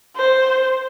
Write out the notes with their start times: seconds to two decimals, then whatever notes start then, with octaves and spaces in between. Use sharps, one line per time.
0.16 C5